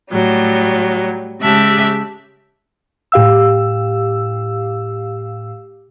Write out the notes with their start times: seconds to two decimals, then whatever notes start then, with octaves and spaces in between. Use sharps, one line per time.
0.10 A2 F#3 G3
1.42 C#3 G#3 G4 E5 A5 F#6
3.12 A2 G4 F5 E6